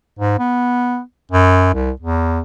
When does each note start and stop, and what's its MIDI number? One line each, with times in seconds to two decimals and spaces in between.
0.19 0.36 44
0.39 1.01 59
1.32 1.71 42
1.74 1.91 36
2.00 2.40 40